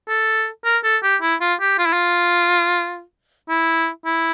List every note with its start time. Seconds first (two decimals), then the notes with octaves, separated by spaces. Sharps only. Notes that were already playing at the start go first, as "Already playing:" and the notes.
0.08 A4
0.65 A#4
0.84 A4
1.03 G4
1.22 E4
1.41 F4
1.60 G4
1.79 F4
1.86 E4
1.93 F4
3.49 E4
4.06 E4